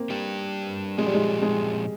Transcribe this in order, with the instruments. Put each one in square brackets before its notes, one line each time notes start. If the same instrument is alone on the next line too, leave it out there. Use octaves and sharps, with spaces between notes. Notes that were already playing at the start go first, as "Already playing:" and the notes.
Already playing: [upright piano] A#3 C4
[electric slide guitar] G3 D4 G4
[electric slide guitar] A#2 F3 C4 F4 G#4 [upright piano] G#3
[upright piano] G3
G#3
G#3